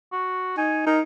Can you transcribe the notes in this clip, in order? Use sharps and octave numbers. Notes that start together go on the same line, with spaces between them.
F#4
D#4 G#5
D#4 A#4